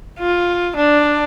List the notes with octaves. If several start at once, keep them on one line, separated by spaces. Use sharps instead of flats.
F4
D4